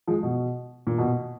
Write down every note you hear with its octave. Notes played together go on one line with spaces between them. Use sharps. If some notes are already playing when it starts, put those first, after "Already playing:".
F3 G#3
B2
A#2
B2